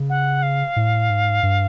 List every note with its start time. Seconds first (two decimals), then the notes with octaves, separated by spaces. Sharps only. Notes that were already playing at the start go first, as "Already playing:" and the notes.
Already playing: C#3
0.09 F#5
0.42 F5
0.76 A2
1.10 G#2
1.43 G2